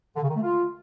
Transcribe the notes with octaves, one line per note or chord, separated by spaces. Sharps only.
D3
C#3
D#3
A3
F4